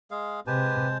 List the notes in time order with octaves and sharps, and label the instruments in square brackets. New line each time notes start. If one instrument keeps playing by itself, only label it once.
[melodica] G#3 G#4 F5
[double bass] C3 [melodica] G#3 C5 A5 [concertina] G4 B4 G#5